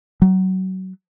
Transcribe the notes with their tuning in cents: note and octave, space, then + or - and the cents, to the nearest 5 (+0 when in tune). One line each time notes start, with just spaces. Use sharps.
F#3 +25